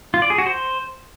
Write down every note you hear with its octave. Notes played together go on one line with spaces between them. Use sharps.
F4
D5
G#4
F#4
C5